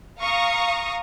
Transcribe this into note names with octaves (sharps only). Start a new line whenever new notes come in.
F5 A#5 C#6 D#6